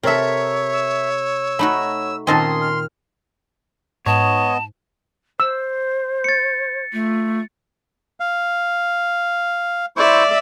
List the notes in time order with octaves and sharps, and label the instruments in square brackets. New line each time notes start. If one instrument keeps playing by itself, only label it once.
[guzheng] C3 A4 [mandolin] A#4 E5 [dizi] C#5
[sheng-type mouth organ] E6
[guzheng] A3 D#4 F#4 [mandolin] B5
[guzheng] A#2 D#3 C4 [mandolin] C#4 D#5 A5 [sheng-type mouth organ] C6
[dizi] F6
[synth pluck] G#2 [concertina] B3 D#5 [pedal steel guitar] C#5 [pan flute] A5
[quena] C5 [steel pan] E6
[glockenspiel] A6 C#7
[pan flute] A3 [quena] F4
[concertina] F5
[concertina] E4 C5 C#6 [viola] D5 E5